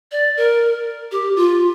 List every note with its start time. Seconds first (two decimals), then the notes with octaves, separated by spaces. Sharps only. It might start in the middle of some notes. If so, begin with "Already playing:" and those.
0.12 D5
0.37 A#4
1.12 G4
1.36 F4